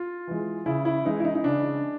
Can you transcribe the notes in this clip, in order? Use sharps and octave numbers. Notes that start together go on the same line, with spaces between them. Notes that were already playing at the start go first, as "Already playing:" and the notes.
Already playing: F4
E3 G#3
C#3 E4
E4
E3 G#3 D#4
E4
D#4
D#4
C#3 D4